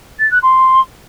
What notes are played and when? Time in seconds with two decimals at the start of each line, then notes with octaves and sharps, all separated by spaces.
0.19 A6
0.31 F#6
0.42 C6